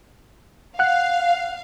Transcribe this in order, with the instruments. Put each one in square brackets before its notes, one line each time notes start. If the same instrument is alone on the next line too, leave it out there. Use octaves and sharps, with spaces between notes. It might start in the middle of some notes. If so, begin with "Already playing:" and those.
[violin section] F5 [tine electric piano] F#5 F#6